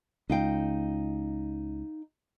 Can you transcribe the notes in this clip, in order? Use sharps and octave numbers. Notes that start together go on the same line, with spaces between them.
C#2 D#4 F5 G5